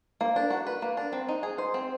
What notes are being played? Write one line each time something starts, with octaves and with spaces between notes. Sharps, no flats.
A#3
D4
F#4
B4
A#3
D4
C4
D#4
G#4
C5
C4